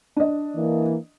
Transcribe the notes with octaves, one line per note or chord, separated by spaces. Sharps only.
D4 D#5
E3 A#3